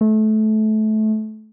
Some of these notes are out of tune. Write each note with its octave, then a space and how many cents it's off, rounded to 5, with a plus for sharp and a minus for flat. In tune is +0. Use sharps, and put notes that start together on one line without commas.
A3 -25